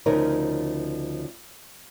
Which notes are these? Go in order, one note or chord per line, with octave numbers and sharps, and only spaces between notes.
D2 C#3 F3 D#4 A#4 C#5